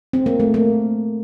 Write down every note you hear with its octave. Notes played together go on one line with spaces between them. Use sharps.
C4
A#3
A3
A#3